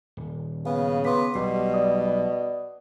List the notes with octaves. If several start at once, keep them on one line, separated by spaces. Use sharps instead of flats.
D#1
C#3 B3 F5
B3 C6 D6 B6
B1 B2 G3 C7
D5 D#6